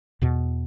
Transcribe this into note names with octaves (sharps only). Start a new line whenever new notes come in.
E2 B2